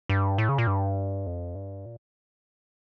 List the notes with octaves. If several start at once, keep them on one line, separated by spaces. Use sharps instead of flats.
G2
A2
C#3
A#2
G2
F2
G2
A#2